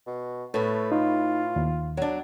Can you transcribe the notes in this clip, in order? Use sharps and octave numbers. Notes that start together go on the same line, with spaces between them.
B2
A2 A3 B4
D#4 F4
D#2
F#3 D4